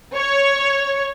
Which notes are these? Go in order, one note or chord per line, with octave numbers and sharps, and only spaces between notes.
C#5